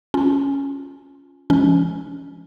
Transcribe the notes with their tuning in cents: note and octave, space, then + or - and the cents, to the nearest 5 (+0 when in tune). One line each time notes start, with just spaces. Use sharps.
C#4 +0 F4 +0
F3 -35 G#3 +0 C#4 +15